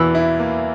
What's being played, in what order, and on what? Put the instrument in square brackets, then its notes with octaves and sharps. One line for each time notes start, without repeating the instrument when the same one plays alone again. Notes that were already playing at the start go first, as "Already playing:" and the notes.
Already playing: [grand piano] E2 B2 A#3 [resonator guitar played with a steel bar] E3
[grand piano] E4
A#3